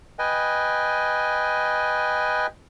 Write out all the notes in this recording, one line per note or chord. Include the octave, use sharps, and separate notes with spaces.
B4 D#5 G5 G#5